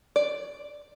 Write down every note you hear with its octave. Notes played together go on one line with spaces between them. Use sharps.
D5